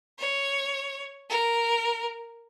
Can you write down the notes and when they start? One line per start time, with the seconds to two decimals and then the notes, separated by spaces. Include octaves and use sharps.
0.19 C#5
1.30 A#4